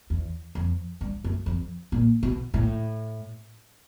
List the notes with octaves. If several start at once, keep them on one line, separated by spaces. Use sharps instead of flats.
E2
F2
G2
F#2
F2
A#2
B2
A2